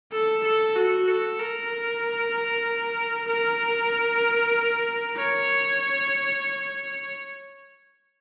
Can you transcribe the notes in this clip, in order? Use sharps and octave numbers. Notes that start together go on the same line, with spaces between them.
A4
A4
F#4
A4
A#4
A#4
C#5